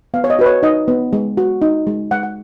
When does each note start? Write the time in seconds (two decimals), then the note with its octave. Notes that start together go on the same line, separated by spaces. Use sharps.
0.14 B3 F5
0.24 C#5
0.30 D#5
0.39 F#4 B4
0.46 C#5
0.63 D#4 D#5
0.88 B3
1.13 G#3
1.37 F#4
1.62 D#4
1.87 G#3
2.11 G#3 F#5
2.23 F#5